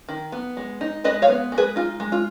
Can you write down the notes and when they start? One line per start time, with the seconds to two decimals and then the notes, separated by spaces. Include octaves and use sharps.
0.09 D#3
0.32 B3
0.57 G#3
0.81 D#4
1.04 G#3 B4 D#5
1.22 C#5 F5
1.28 B3
1.52 G#3
1.58 G#4 B4
1.76 D#4 F4
2.00 G#3
2.12 F4